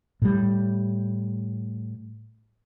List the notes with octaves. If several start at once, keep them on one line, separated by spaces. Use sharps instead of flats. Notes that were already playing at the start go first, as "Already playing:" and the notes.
A2 G3